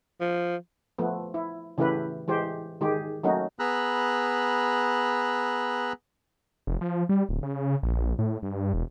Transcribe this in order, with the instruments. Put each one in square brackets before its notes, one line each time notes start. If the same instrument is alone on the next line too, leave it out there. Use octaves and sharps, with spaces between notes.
[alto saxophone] F3
[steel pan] F3 A3 B3
E4
C#3 E3 A3 E4 G4 B4
E3 G#3 G4 C5
D#3 G#3 G4 G#4
F#3 A3 A#3 C#4 D#4 F#4
[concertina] B3 G#4 A#5 B5 E6 F#6
[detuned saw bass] F1
F3
G3
D1
C#3
A#1
A2
G2
E1